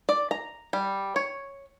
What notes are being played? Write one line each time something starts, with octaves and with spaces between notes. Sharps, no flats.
D5
A#5
G3
C#5